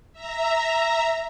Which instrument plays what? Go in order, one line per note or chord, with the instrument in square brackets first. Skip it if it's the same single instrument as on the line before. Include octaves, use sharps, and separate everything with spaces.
[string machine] E5 A#5